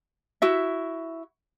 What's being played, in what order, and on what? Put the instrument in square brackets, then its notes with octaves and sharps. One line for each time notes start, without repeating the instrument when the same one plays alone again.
[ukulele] E4 F#4 E5